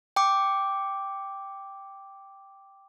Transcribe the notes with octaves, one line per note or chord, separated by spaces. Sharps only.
G5 D6